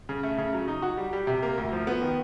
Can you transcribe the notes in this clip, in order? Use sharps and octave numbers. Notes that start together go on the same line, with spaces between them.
C#3
A3
C#3
F#3
D#4
F#4
G3
G3
C3
A#3
D2
F3
B3
D#3